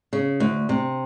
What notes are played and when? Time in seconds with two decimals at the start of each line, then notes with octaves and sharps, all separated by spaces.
0.13 C#3
0.40 D2
0.69 C3